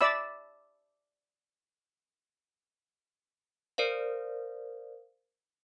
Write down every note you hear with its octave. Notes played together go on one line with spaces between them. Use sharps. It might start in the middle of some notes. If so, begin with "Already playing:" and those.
D5 E5 B5 E6
A#4 C5 D5 F5